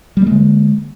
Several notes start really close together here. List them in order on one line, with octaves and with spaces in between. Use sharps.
G3 A#3 G#3 D3